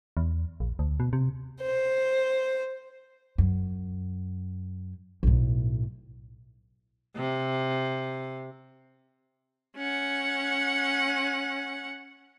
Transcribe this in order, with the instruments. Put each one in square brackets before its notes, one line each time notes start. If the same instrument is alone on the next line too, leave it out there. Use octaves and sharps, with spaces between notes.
[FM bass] E2
A#1
D2
B2
C3
[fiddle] C5
[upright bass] F#2
B1 A2
[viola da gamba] C3
[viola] C#4 F#5